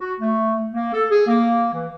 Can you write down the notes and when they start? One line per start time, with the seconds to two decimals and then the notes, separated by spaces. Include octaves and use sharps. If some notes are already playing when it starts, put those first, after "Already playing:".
0.01 F#4
0.20 A3
0.72 A#3
0.93 A4
1.11 G#4
1.26 A#3
1.72 E3